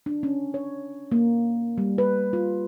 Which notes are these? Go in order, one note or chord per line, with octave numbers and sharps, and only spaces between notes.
D4
C#4
C#5
A#3
G3
B4
F4